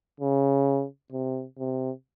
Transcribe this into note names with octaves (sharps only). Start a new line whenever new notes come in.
C#3
C3
C3